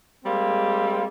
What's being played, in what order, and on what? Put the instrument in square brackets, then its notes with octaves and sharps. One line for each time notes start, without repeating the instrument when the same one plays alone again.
[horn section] G3 G#3 A#3 C4